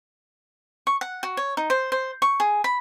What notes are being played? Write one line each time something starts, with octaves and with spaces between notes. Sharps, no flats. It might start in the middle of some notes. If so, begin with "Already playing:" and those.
C#6
F#5
F#4
C#5
D#4
C5
C5
C#6
G#4
B5